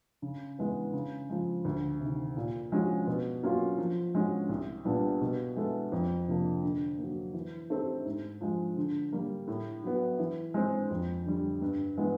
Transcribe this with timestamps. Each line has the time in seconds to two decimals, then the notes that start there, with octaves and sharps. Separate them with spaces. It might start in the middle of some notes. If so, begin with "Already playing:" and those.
0.22 C#3
0.59 E3 G#3 B3
0.93 C#3
1.30 F3 G#3
1.65 D2
2.00 C3
2.05 D#3
2.37 A#2
2.72 F3 G#3 C#4 F#4
3.07 B2
3.43 F#3 A#3 C#4 F4
3.78 F3
4.15 G#3 C#4 F#4
4.49 C2
4.85 A#2 G3 B3 D4
5.21 B2
5.56 G#3 B3 E4 A4
5.92 F2
6.28 C3 F3 A#3 D4
6.63 D3
6.98 F#3 A#3
7.34 E3
7.70 A3 C4 D#4 G4
8.05 G#2
8.41 F3 G#3
8.77 D3
9.12 G3 A#3
9.47 A2
9.84 F#3 B3
10.19 E3
10.54 G#3 C4
10.91 F2
11.26 D3 G3
11.62 G2
11.97 E3 G#3 B3